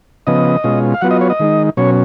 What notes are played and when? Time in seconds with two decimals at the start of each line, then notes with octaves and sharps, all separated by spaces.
0.27 C#3 F3 B3 D#5
0.64 B2 G#3 C#4 F4
0.94 F5
1.01 F#3 B3 F4 F#5
1.11 D#5
1.21 C#5
1.30 D#5
1.40 D#3 G#3 D#4
1.77 B2 F#3 C#4 C#5